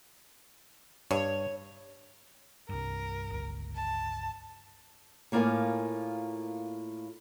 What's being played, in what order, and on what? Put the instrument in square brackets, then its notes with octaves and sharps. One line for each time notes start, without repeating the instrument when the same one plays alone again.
[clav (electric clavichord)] G2 [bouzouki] C#5
[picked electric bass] C2 G2 [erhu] A#4
[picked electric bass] G1 C#2
[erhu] A5
[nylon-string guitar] A2 A#3 F4 A#4 D5 G#5